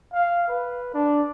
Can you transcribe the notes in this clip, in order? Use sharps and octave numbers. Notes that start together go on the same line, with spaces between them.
F5
B4
D4